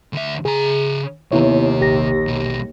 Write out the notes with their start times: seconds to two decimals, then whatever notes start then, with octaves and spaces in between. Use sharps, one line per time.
0.13 D2 E5
0.45 C#3 G#4 A#5
1.32 D#2 C3 B3 E4 C#5
1.80 A#1 G4 A#6
2.27 B2 G3